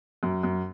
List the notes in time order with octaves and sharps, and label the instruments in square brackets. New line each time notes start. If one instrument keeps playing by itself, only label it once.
[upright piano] F#2
F#2